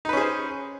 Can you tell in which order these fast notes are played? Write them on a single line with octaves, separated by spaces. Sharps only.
D#4 B4 C#4 G#4 C5